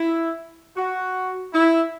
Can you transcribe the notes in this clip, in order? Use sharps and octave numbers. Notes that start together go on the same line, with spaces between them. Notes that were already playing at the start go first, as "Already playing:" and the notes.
Already playing: E4
F#4
E4